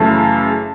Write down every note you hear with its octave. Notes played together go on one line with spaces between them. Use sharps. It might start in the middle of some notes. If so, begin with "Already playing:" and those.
Already playing: F#2 C#3 E3 A3 A5